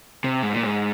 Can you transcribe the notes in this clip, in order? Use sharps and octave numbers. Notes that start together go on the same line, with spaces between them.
C3
G#2
A#2
G#2